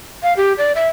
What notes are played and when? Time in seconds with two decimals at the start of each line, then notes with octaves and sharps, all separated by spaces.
0.23 F5
0.37 G4
0.58 D5
0.75 E5